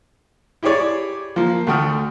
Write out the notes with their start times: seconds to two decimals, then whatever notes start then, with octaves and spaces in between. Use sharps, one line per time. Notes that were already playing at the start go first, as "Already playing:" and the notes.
0.63 E4 G4 G#4 C#5 D5
1.36 F3 A#3
1.67 D2 A3 F#4 G5 D#6 F6